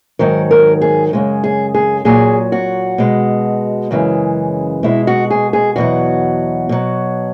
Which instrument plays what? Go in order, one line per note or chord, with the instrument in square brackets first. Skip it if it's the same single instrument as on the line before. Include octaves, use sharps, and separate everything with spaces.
[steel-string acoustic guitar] G#2 D#3 F#3 A#4
A#4
G#4
F#2 C#3 G#3
G#4
G#4
A#2 F#3 G#4
F#4
B2 G#3
F#2 C#3 E3 G#3
B2 G#3 E4
F#4
G#4
G#4
E2 B2 F#3 F#4
B2 F#3